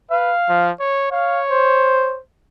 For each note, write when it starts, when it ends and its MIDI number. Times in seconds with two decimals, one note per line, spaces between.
0.11 0.34 71
0.11 0.72 77
0.49 0.72 53
0.80 1.09 73
1.12 2.17 73
1.12 1.41 77
1.50 2.20 72